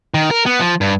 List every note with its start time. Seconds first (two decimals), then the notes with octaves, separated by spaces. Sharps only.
0.14 D#3
0.31 A#4
0.46 B3
0.60 F3
0.81 G2